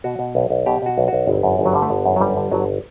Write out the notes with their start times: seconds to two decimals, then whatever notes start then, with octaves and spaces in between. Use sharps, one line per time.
0.04 B2 F#4
0.19 B2
0.35 B1
0.50 B1
0.66 B2 G4
0.82 B2 F#4
0.98 B1
1.08 B1 F#4
1.27 G1
1.43 F#2
1.59 G1
1.66 F#3
1.73 D3 G3
1.82 A3
1.90 G1 B3
2.05 F#2
2.16 F#3
2.20 G1 G3
2.37 D3
2.51 G1 F#3